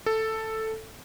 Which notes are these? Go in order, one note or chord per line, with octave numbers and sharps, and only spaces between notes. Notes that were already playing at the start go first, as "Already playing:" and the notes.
A4